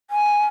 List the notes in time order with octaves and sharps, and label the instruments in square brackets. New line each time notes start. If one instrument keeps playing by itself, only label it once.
[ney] G#5